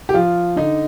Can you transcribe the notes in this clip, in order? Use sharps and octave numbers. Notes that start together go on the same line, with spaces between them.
G4
F3 F4
D3 D#4